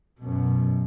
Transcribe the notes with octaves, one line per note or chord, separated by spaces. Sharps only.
F#2 B2